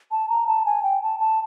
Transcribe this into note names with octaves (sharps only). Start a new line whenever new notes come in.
A5
A#5
A5
G#5
G5
A5
A5